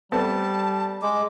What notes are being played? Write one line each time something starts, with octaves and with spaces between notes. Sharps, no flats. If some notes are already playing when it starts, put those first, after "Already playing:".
G3 A3 B3 C4 A5
G#3 D6